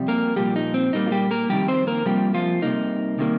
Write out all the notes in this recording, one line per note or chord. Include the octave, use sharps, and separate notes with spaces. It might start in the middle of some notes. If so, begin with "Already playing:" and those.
Already playing: F2 C3 G3
A#3 A#4
A#2 F3 G3 A#3 G4
D#4
C4
A#2 G3 A#3 D#4
F4
G3 G4
A#3 A#4
F2 C3 D#3 G3 G4
C4 C5
A#3 A#4
C3 F3 G3 A#3 G4
F3 F4
C3 G3 A#3 D#4
C3 D#3 G3 A#3